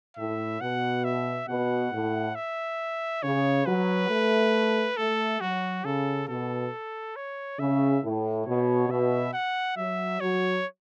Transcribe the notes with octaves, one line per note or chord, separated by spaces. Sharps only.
A2 E5
B2 F#5
E5
B2 F#5
A2
E5
C#3 C#5
F#3 B4
A3
A3 A4
F#3 F#4
C#3 A4
B2 A4
C#5
C#3 E5
A2
B2 C#5
B2 E5
F#5
F#3 E5
F#3 C#5